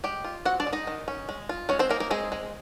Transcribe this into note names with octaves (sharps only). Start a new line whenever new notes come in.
G#3 G4 G5
F4
C4 F#4 F#5
D4 D5
G#3
D#4 D#5
D#3
C#4
G#3
F4
G#3 C#4 C#5
C4 C5
A#3 D#4 A#4
A#3 A#4
G#3 C4 G#4
G#3